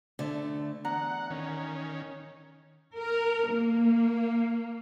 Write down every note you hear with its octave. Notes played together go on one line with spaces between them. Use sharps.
D2 D3 A3
E2 F#5 A#5
D#3 C#4
A#4
A#3